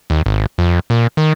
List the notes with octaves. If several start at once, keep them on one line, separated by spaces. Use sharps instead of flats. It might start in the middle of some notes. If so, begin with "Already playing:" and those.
D#2
G#1
F2
A#2
D#3